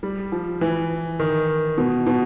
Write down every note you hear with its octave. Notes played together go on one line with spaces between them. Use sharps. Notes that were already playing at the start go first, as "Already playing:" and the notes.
G3
F3
E3
D#3
B2
B2